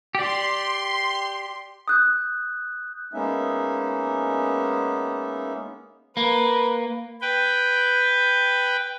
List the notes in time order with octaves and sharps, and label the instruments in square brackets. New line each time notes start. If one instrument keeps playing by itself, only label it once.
[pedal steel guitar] G4 D5 [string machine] C6
[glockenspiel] D#6 F#6 G6
[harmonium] G#3 A#3 B3 C#4 D#4 E5
[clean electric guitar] A#3 [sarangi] B4
[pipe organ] B4 G5